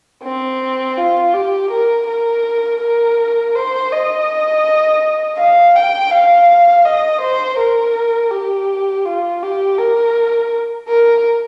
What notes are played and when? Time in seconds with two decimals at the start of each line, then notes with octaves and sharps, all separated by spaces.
0.24 C4
0.97 F4
1.34 G4
1.71 A#4
2.07 A#4
2.81 A#4
3.55 C5
3.92 D#5
5.38 F5
5.75 G5
6.11 F5
6.85 D#5
7.21 C5
7.58 A#4
8.31 G4
9.06 F4
9.43 G4
9.78 A#4
10.88 A#4